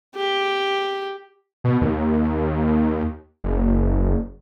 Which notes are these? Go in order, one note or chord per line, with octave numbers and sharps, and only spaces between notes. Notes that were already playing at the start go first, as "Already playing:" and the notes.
G4
B2
D#2
F#1